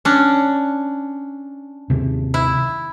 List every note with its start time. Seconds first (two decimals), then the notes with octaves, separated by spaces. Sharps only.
0.05 C#4 D4
1.90 D#2 C3
2.34 E4